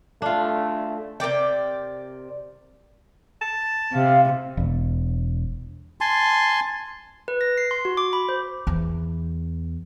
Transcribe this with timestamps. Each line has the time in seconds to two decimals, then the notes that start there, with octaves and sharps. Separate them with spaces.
0.22 A3 D4 F4
1.20 C3 A#4 D5 G5
3.41 A5
3.93 C3 F5
4.57 E1
6.01 G#5 A5 C6
7.28 B4
7.41 A#6
7.58 C7
7.71 C6
7.85 F#4
7.97 D6
8.13 B5
8.29 C5
8.67 E2